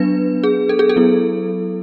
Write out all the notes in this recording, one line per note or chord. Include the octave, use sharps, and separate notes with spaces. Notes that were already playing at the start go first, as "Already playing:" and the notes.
Already playing: F#3 B3 D4 B4
G#4
A4
G#4
A4
F#3 B3 E4